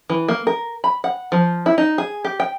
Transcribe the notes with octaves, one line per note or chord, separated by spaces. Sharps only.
E3
A#3
A#4
B5
F#5
F3
E4
D#4
G#4
G4
G5